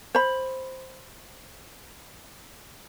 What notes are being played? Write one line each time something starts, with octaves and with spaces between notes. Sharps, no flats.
C5 B5